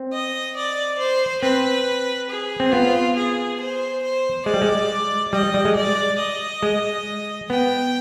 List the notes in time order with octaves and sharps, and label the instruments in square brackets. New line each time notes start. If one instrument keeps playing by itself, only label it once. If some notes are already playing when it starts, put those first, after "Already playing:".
Already playing: [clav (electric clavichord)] C4
[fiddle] D#5
D5
C5
[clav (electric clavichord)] C4 [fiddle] B4
[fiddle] G#4
[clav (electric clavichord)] C4
[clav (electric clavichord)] B3 [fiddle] F4
[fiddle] G#4
C5
C5
[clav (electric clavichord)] G#3 [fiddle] D5
[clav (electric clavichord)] G3
G#3
[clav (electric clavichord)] G3 [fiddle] D#5
[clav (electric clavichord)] G3
G#3
[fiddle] D5
D#5
[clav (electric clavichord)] G#3
[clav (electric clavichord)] B3 [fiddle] G5